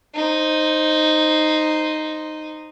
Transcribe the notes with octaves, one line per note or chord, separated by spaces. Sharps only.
D#4 C5